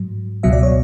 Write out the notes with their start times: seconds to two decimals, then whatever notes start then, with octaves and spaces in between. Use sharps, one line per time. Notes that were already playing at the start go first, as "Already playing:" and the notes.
Already playing: G#2 F#3
0.43 C#2 B2 F#3 E5
0.53 D5
0.63 C#5